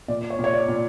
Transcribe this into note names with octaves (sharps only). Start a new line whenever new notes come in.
A#2 D5
C#5
A#2
C#5
D5
A#2